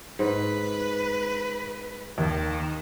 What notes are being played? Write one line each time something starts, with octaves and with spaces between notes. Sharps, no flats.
G#2 B4
D#2 D#3